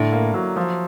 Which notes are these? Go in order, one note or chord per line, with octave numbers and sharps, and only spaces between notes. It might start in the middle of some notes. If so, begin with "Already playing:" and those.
Already playing: A2 D3
A#3
F#3
F3